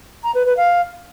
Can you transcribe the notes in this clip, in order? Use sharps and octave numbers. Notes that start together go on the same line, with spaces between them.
A#5
B4
B4
F5